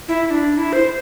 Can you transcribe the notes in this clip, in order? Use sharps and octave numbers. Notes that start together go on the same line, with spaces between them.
E4
E4
D4
E4
C5